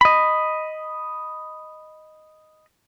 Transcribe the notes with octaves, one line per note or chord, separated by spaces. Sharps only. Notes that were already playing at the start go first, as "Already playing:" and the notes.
D#5 B5